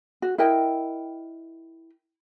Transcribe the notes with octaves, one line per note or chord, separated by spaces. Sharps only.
F#4
E4 A#4 D#5 G5